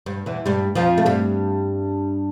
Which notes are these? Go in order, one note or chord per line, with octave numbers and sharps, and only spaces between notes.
G2
E2 E3
G2 G3
F2 F3
A3
G2 G3